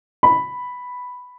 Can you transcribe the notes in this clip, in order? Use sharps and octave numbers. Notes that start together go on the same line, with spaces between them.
B5